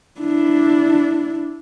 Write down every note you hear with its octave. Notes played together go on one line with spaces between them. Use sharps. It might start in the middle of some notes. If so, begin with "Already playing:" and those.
D4 E4